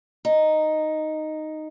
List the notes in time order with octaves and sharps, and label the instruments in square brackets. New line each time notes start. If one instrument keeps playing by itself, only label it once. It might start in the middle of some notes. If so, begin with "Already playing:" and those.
[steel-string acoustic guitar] D#4